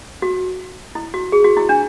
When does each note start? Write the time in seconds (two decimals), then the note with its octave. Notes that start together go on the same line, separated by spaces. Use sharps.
0.22 F#4
0.95 E4
1.14 F#4
1.32 G#4
1.44 F#4
1.57 E4
1.69 D4